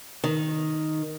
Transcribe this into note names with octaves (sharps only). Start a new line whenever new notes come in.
D#3